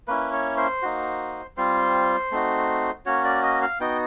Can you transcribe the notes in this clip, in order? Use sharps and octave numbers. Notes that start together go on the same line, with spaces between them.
A#3 C#4 E4 B4
C#5
C5
A#3 D#4 F#4
G3 C4 F4 C5
A3 C4 D#4 F#4
A#3 C#4 F#4 C#5
D5
D#5
F5
B3 D#4 F#4 G5